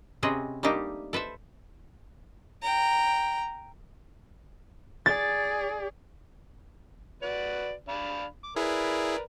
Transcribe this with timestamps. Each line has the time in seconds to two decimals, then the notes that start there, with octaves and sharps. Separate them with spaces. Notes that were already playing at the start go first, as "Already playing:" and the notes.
0.23 C3 C4 C#4 G#4 B4 D#5
0.63 G3 A3 A#3 D4 D#4 G4
1.13 A4 B4 C5 E5
2.62 G5 A#5
5.06 G#4 D5 A6
7.22 F#4 B4 D5
7.89 D4 F5 B5
8.44 D6
8.56 E4 G#4 A#4 B4 D5